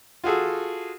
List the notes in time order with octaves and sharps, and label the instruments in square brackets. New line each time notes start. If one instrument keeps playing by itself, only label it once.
[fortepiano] F4 F#4 G#4 A4